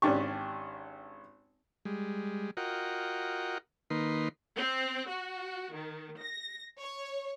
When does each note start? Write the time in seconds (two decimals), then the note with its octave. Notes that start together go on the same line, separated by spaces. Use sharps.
0.02 G#1 C#4 D4 G4 C#6
1.85 G3 G#3
2.57 F4 F#4 A#4 D#5 F#5 G5
3.90 D#3 A#3 D#4 B4 C6
4.57 C4
5.09 F#4
5.73 D#3
6.20 A#6
6.80 C#5